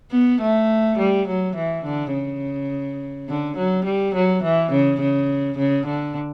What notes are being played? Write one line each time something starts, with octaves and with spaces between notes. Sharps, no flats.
B3
A3
G3
F#3
E3
D3
C#3
D3
F#3
G3
F#3
E3
C#3
C#3
C#3
D3